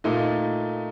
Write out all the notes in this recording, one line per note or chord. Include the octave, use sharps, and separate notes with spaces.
A#2 A3 D#4